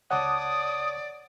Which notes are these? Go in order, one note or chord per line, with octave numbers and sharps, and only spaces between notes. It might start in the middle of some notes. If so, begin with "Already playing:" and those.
C#2 C#5 D5 F#5 A5 D6 D#6